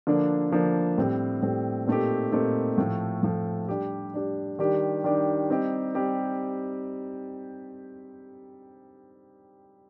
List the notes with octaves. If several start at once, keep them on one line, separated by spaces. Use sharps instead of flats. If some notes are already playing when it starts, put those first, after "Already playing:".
D3 F3 A#3 D4
D3 F3 A#3 D4
A2 G3 C4
A2 G3 C4
A#2 A3 C4 D#4 G4
A#2 A3 C4 D#4 G4
A2 F3 A3
A2 F3 A3
G3 D4 G4
G3 D4 G4
D#3 G3 D4 G4
D#3 G3 D4 G4
G3 C4 D#4 G4
G3 C4 D#4 G4